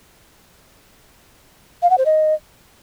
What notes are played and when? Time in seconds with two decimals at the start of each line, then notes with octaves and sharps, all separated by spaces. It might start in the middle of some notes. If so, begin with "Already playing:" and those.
1.82 F5
1.90 F#5
1.98 C5
2.05 D#5